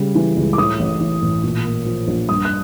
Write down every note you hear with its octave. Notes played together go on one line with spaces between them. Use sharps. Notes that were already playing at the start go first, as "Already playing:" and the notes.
Already playing: C#3 G3
E3
C#2
D6
A2 D#6
A1
E3
A1
A#2
A#3
F3
A#1
G2 D#6
F#6